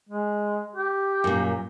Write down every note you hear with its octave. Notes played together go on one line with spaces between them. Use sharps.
G#3
G4
F#2 A#2